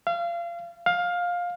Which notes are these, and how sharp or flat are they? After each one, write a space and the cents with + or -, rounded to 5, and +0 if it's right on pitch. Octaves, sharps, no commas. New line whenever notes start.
F5 -30
F5 +15